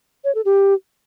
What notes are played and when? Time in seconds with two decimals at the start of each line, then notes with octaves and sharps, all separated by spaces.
0.24 C#5
0.35 A4
0.45 G4